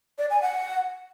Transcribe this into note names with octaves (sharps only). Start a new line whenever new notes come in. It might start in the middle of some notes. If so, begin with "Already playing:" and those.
D5
G#5
F#5